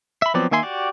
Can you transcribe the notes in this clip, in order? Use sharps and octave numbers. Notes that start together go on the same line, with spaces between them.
E5 B5
F3 F#3 B3 C4 D5
D#3 A#3 E5 G#5 C6
F#4 G4 D5